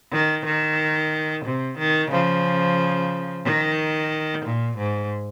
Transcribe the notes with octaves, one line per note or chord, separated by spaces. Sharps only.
D#3
D#3
C3
D#3
C#3 F3
D#3
A#2
G#2